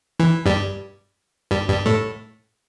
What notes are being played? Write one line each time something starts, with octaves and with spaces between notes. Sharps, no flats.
E3
G2 G3
G2 G3
G2 G3
A2 A3